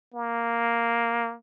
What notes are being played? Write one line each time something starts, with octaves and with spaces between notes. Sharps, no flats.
A#3